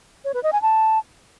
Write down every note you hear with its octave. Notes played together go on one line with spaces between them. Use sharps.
C#5
B4
D#5
G#5
A5